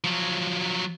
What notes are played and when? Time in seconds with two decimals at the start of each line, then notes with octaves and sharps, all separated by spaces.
0.04 F3 F#3